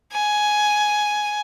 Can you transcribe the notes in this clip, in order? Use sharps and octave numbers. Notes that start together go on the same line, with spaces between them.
G#5